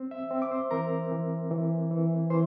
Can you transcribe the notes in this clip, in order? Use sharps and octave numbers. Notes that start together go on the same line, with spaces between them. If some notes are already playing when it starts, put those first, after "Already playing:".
Already playing: C4
E5 E6
C4
D6
C5 C6
E3 A#4 A#5
E3
E3
E3
E3 C5 C6